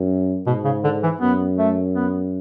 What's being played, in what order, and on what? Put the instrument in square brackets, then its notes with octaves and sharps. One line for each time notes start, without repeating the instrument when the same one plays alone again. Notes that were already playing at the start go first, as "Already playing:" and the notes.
Already playing: [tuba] F#2
[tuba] G#2 [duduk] B2
[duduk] C#3
D3
E3
[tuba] F#2 [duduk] B3
[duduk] A3
B3